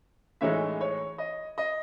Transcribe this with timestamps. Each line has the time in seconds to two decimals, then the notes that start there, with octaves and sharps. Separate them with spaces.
0.41 A2 E3 G#3 D#4 C#5 E5
0.81 C#5
1.18 D#5
1.58 D#5